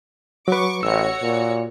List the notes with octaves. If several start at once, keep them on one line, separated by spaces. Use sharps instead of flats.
F#3 B4 C#6 D6
A1 F#4 C#5 E6 C#7
A#2